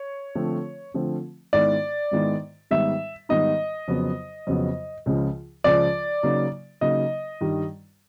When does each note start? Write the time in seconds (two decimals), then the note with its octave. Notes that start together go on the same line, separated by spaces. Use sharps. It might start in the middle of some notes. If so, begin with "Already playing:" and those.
Already playing: C#5
0.35 D3 F3 A3 C4
0.94 D3 F3 A3 C4
1.53 G#2 D#3 G#3 B3 E4 D5
2.11 G#2 D#3 G#3 B3 E4
2.71 G#2 D#3 G3 B3 D#4 E5
3.29 G#2 D#3 G3 B3 D#4 D#5
3.88 F2 C#3 F#3 B3
4.47 F2 C#3 F#3 B3
5.06 C#2 C#3 F3
5.64 C#2 C#3 F3 D5
6.23 C#3 F#3 A#3 D#4
6.81 C#3 F#3 A#3 D#4 D#5
7.41 G2 D#3 G3